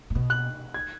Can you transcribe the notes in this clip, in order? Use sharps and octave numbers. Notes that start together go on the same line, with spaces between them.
A#2
B2
F#6
G#6